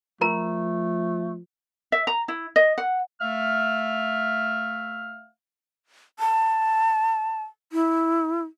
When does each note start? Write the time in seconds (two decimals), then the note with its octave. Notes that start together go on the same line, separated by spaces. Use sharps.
0.21 F3 A3 F4 A#4 A#5
1.92 E5
2.07 A#5
2.28 E4
2.56 D#5
2.78 F#5
3.20 A3 E5 F5 F6
6.19 A5
7.73 E4